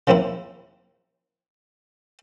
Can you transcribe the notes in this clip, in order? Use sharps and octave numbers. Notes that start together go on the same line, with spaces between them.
C#3 F3 A#3 C4 E4